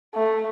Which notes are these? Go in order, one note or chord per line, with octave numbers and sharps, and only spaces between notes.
A3